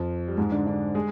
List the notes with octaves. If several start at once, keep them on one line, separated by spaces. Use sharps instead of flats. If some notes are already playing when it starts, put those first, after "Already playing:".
Already playing: F2 F3
G3
G#2 G#3
D3 D4
D3 D4
G#3 G#4